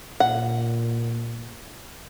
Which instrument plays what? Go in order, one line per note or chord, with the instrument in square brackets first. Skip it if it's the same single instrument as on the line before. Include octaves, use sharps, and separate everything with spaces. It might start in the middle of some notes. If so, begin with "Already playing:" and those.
[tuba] A#2 [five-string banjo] F#5